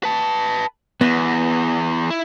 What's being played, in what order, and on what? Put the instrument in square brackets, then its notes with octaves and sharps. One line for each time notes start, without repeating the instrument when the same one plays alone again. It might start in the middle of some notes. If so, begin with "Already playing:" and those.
[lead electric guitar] B4 A5
[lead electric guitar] E2 [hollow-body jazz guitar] B3
[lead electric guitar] E4